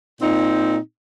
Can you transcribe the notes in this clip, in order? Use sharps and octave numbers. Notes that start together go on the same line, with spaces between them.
A#2 C4 D#4